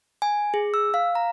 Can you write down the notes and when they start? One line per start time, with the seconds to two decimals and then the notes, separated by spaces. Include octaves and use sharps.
0.22 G#5
0.54 G#4
0.74 E6
0.94 F5
1.15 A#5